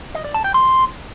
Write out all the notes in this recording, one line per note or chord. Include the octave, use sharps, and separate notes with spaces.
D#5
D5
A5
G5
C6